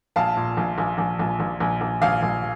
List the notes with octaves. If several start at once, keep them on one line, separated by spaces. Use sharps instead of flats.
A#1 F5 A5
A#2
A#1
A#1
A#1
A#1
A#1
A#1
A#1
A#1 F5
A#1